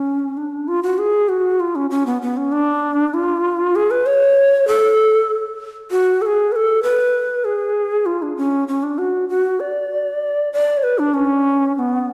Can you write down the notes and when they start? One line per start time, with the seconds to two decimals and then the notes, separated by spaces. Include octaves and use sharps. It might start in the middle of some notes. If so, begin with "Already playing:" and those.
Already playing: C#4
0.37 D4
0.68 F4
0.83 F#4
0.99 G#4
1.29 F#4
1.60 F4
1.75 C#4
1.90 C#4
2.06 B3
2.22 B3
2.37 C#4
2.52 D4
3.14 F4
3.76 G#4
3.91 B4
4.06 C#5
4.68 A4
5.91 F#4
6.22 A4
6.26 G#4
6.52 B4
6.56 A4
6.83 B4
7.45 G#4
8.06 F4
8.22 D4
8.37 C#4
8.68 C#4
8.83 D4
8.98 F#4
9.29 F#4
9.60 D5
10.53 D5
10.77 C#5
10.83 B4
10.99 D4
11.14 C#4
11.76 C#4
11.79 B3